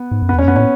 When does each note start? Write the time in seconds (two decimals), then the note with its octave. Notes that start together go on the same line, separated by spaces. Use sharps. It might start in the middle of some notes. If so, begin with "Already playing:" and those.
Already playing: B3
0.11 G#2
0.22 F#2
0.29 B3
0.33 E2
0.38 C#4
0.44 F#2 B3
0.56 A2 C#4